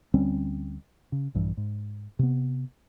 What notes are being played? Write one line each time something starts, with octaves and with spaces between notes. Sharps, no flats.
D2 G3 C4 C#4
C#3
A#1 G2 E3
G#2
C3 B3